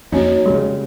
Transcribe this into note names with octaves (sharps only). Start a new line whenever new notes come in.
F2 A#3 C#4 D#4 F#4 C#5
C#3 G3 G#3